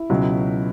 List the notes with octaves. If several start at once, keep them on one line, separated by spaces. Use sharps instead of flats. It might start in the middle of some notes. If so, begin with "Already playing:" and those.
Already playing: E4
C#2 B2 F#3